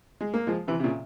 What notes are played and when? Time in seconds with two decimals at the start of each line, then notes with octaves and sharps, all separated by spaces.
0.21 G#3
0.34 A#3
0.47 F3 G#3
0.67 C3 E3
0.80 C3
0.83 A#2 C#3